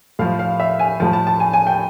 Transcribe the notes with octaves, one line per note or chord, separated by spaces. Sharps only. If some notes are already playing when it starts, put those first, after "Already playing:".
A2 F3 F5
F5
E5
G#5
A2 F3 A5
A5
A5
G#5
G#5
G5